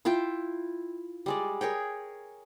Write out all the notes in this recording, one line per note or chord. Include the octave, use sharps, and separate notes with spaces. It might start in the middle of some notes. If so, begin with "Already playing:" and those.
E4 F4 E5 G5
G3 G#3 D5
G#4 A#4 C#5 G5